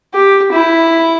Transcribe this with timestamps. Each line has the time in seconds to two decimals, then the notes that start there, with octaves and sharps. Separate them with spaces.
0.14 G4
0.52 E4